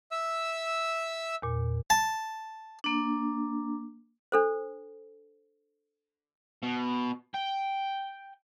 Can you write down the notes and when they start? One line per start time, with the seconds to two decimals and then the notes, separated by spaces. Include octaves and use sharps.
0.11 E5 E6
1.42 E2 A#2
1.90 A5
2.84 A#3 D4
4.32 D4 A4 C5
6.63 B2
7.34 G5